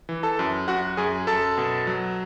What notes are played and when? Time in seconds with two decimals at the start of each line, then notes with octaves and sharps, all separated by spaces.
0.09 E3
0.23 A4 A5
0.39 F#2
0.68 F#2 F#4 F#5
0.97 F#2 G#4 G#5
1.27 F#2 A4 A5
1.57 B2
1.87 F#3